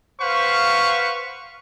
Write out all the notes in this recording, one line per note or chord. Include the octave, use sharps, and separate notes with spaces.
B4 C5 F5 F#5 C#6